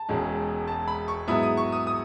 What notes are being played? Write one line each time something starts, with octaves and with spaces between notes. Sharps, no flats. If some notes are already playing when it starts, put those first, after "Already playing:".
Already playing: A5
E1 E2 B2 G#3 C#4
A5
B5
C#6
G#2 F#3 B3 E4 D#6
D#6
C#6
D#6
D#6